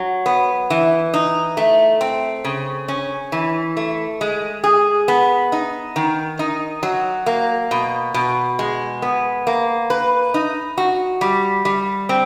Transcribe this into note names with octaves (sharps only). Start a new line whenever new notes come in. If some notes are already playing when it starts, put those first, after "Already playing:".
Already playing: F#3
B3
E3
D#4
A3
C4
C#3
C#4
E3
A3
G#3
G#4
B3
D#4
D#3
D#4
F#3
A#3
B2
B2
G#3
B3
A#3
B4
D#4
F#4
G3
G3
C4